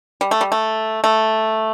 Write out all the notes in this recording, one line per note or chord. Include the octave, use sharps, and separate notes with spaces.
G3
A3
G3
A3
A3